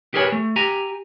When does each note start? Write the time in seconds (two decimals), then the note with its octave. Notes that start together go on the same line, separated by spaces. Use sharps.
0.14 G4 G#4 A#4 B4 C#5 G#5
0.32 A3
0.56 G4 G#5 A#5